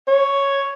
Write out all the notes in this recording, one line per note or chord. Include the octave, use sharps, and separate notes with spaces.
C#5